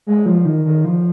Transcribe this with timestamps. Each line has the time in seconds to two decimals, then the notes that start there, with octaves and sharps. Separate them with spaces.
0.07 G#3
0.26 F3
0.45 D#3
0.65 D#3
0.85 F3